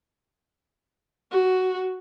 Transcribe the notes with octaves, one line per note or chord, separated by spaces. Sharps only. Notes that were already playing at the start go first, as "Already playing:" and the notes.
F#4